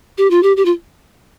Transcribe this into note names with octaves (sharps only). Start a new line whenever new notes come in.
G4
F4
G4
G4
F4